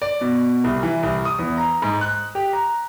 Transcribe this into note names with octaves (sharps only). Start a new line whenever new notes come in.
D5
B2
C2
E3
C2
D#6
E2
A#5
G#2
F#6
G4
A#5